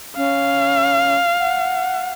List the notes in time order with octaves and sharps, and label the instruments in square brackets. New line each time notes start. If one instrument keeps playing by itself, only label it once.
[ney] C#4 [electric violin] F5
[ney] F#5